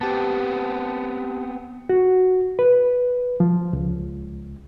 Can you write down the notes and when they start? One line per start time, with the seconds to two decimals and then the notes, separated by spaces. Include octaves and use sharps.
0.01 B3 C4 G4 A5
1.89 F#4
2.59 B4
3.40 F3
3.73 C#2